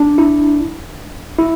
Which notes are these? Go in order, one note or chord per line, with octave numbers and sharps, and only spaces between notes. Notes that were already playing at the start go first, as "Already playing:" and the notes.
Already playing: D4
E4
E4